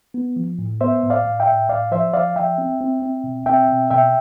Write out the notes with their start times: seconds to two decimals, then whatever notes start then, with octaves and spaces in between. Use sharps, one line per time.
0.14 B3
0.36 F3
0.59 A2
0.81 B3 C5 E5
1.03 A2
1.10 D5 F5
1.25 A2
1.40 E5 G5
1.47 A2
1.69 A2 D5 F5
1.92 F3 C5 E5
2.13 F3 D5 F5
2.36 F3 E5 G5
2.58 C4
2.81 C4
3.02 C4
3.24 B2
3.46 C4 E5 G5
3.68 B2
3.91 B2 E5 G5